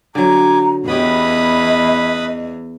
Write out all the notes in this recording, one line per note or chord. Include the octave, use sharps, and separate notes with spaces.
D3 F#3 G#5 A#5 D6
E2 B3 C#4 G4 B4 D#5 B5 D#6